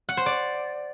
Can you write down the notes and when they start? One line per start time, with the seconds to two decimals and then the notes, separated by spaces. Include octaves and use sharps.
0.09 F#5
0.17 C5
0.26 D5